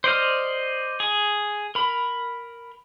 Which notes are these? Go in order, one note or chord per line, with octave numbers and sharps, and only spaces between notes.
C5 D5 D#5 F6
G#4
A#4 B5